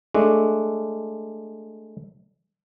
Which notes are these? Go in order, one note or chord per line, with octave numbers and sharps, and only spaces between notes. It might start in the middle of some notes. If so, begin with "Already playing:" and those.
G#3 A3 D4